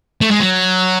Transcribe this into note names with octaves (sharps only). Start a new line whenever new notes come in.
A3
G#3
F#3